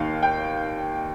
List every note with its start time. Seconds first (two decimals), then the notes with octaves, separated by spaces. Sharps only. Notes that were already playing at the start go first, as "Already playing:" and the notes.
Already playing: D#2 D#3 F5
0.23 G5